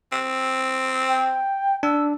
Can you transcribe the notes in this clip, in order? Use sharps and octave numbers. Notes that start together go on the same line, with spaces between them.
C4
G5
D4 E6